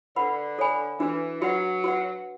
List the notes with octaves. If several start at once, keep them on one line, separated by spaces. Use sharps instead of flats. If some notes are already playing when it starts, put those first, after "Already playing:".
D3 B4 F#5 B5
A4 C#5 G#5 B5
E3 D4 F#4 B4
F#3 F#4 B4 F#5
F#4 B4 F#5